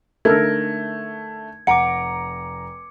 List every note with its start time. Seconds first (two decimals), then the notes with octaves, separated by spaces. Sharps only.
0.25 D3 A3 D#4 A4 A#4 G#6
1.67 F1 F#5 A#5 D6 C#7 D7